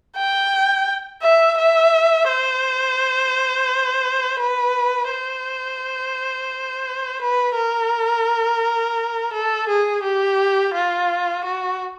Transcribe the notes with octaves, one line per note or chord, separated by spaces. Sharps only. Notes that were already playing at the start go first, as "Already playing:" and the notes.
G5
E5
E5
C5
B4
C5
B4
A#4
A4
G#4
G4
F4
F#4